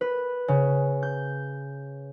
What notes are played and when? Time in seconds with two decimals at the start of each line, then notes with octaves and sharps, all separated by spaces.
0.01 B4
0.48 C#3
1.03 G6